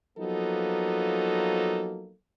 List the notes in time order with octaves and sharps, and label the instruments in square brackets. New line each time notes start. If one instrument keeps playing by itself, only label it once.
[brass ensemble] F3 F#3 A#3 B3 D#4 A4